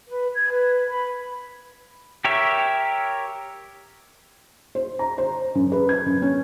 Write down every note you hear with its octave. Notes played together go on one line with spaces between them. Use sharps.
B4
G#6
B4
B5
G4 A#4 C#5 E5
C5
A#5
C5
F#2
B4
G#6
F#2
C#4